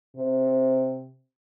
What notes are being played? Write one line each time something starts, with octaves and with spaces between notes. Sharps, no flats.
C3